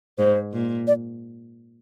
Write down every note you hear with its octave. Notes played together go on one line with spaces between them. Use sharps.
G#2 C5
A#2
D5